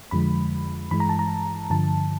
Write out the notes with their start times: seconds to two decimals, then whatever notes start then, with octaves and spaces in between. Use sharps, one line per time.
0.11 F2 D3 F3 G#3 B5
0.91 G2 E3 G#3 B5
1.00 A#5
1.09 A5
1.19 A#5
1.70 G2 D3 F3 A5